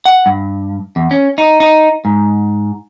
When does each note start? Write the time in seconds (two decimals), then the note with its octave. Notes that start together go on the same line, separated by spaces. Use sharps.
0.05 F#5
0.26 G2
0.96 E2
1.11 C#4
1.38 D#4
1.60 D#4
2.05 G#2